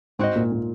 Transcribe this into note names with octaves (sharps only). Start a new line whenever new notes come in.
G#2 C4 F#4 C5 D#5
A#2
A#2